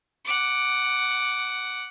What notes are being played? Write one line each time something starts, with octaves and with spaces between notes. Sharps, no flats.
F#5 D6